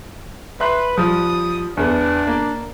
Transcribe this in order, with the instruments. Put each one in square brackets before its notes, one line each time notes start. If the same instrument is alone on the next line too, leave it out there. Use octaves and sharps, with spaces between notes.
[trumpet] B4 [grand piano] E5 C6 F#6
[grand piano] F3 G3 [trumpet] D#6
[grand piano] E2 B3 [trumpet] D4
[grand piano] A#3